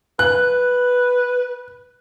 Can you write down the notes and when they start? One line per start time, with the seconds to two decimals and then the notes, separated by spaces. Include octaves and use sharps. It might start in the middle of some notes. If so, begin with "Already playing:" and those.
0.19 B4 F#6